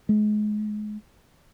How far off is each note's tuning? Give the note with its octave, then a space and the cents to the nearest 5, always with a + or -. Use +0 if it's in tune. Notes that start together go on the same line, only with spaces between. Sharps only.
G#3 +30